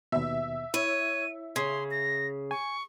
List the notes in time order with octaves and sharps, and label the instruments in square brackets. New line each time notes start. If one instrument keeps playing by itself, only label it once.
[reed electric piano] D#2 B2 [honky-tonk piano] E5
[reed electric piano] E4 [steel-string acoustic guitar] C#5 [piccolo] D#7
[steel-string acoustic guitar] C#3 [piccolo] C6 [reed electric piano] G#6
[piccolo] A#6
[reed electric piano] G#5 [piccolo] C#6